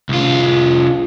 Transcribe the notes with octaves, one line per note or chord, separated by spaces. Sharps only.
C2 F4